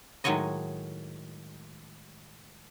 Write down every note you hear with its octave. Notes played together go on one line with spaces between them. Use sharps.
A2 D#3 F#3 G#3 C#5 D#5